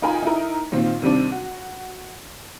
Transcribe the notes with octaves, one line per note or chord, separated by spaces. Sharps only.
D#4 F4 A#4 G5 G#5 B5
D#4 E4 A#4
A#2 D#3 C4 F4
C3 D#3 G3 C4 D4
F#4